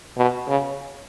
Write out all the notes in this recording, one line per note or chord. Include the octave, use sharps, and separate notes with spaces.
B2
C#3